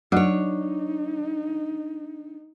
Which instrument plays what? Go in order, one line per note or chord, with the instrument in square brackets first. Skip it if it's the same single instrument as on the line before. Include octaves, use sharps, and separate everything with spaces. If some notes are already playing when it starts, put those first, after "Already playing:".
[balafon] F#3 F#4 F#5 [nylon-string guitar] D4 C#5 [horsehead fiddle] D#4